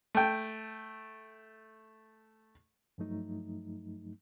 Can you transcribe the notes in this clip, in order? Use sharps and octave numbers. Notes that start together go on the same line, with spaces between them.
A3 G5
G2 F3 F#3 A3 D#4